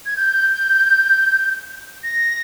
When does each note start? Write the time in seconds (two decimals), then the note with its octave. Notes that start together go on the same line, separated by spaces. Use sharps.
0.06 G#6
0.16 G6
2.03 A#6